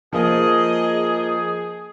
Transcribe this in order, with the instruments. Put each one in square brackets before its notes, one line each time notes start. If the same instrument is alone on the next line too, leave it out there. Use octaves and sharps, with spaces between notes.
[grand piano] F3 A#3 [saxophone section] G#4 [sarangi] D#5